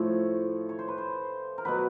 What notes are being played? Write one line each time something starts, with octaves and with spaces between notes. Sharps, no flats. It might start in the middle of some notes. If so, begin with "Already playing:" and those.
Already playing: A2 F3 C#5
C#5
C5
B4
C5
A#4
B2 F#3 B4